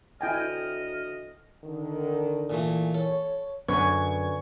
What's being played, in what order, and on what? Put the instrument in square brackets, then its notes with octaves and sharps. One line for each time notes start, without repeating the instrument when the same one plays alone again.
[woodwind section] D2 D#5 F6 [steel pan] E4 G5 G#5
[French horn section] D3 D#3
[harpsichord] A#2 E3 A3
[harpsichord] A4 [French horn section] C#5
[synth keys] F#2 G#6 [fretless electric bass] D3 B3 [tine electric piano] B4 D5 G#5 [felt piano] C#6